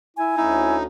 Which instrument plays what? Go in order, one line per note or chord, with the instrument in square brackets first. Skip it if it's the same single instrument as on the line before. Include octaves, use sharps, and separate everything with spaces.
[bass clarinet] E4 [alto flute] G#5
[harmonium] D2 A3 C#4 [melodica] D#4 [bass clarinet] E4